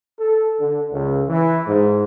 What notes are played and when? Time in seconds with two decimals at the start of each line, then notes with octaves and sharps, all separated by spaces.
0.19 A4
0.60 D3
0.92 C#2
1.29 E3
1.67 G#2